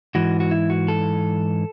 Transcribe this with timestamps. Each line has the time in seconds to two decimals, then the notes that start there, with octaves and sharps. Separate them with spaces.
0.15 G#2 E3 F#4
0.40 F#4
0.51 E4
0.70 F#4
0.88 A4